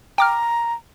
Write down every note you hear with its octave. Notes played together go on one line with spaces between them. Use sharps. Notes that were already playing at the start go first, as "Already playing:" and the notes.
G5 A#5 D6 F6